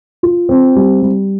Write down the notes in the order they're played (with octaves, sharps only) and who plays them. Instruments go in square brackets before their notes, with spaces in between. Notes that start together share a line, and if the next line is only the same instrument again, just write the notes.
[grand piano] F4
C4
G3
G3